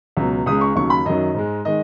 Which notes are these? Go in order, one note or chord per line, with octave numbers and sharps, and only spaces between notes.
C#2 B2 F#3
C#2 C#3 G#3 D#6
C#6
D#2 C#3 F#3 C#6
B5
F#2 D#3 F#3 D#5
G#2 G#3
D#3 G#3 D#5